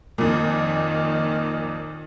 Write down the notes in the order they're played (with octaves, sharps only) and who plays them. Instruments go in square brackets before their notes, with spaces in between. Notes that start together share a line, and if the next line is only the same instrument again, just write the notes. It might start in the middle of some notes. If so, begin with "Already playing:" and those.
[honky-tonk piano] F2 A#2 [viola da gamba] D#3